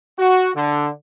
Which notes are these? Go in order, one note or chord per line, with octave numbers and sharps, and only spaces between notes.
F#4
D3